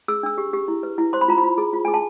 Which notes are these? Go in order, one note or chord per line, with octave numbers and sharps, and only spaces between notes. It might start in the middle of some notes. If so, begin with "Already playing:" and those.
G#4 E6
D4 E6
G4
G4
E4
B4
E4
C5 C6
B5
F4 A#5
B5
F4
G#4
F4
G#4 G#5
A5